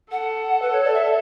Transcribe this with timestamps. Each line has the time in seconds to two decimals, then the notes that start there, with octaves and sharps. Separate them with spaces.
0.11 A4 F#5
0.62 B4
0.72 C#5
0.84 D5
0.94 E5